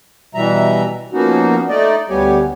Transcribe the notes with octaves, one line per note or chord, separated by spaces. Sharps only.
B2 E3 G3 E5 A#5
F3 A#3 B3 C#4 D#4 F#4
A3 D#4 D5 D#5
D2 G3 B3 G4 C#5 G#5